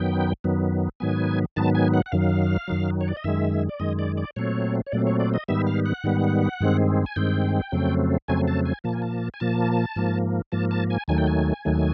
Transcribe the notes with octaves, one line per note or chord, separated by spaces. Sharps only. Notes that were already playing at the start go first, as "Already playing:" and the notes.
Already playing: F#2 D#3 F#3 B3 G5
F#2 D#3 F#3 B3
G#2 D#3 F#3 B3 G#5
G#2 D#3 F#3 B3 A5
G#5
F#5
F#5
F#2 D#3 F#3 F5
F#2 D#3 F#3
C#5
D5
D#5
F#2 D#3 G#3 E5
D5
F#2 D#3 G#3 D#5
D5
D5
A#2 F#3 A3 C4 C#5
C#5
A#2 F#3 A3 C4 D5
C#5
D5
D#5
G#2 D#3 G3 B3 E5
F5
F#5
G#2 D#3 G3 B3
G2 D#3 G#3 C4
G#5
G2 D#3 G#3 C4 G5
F2 C#3 F#3 A3 C4
F2 C#3 F#3 A3 C4 G#5
A5
G#5
A#2 F3 A#3 A5
G#5
A5
G#5
A#2 F3 A#3 A5
G#2 F3 A#3
G#2 F3 A#3 A5
A5
G#5
D#2 D#3 F#3 A3 G#5
G5
G#5
D#2 D#3 F#3 A3